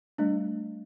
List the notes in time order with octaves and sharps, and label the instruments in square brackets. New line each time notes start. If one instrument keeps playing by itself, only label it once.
[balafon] G3 A3 D4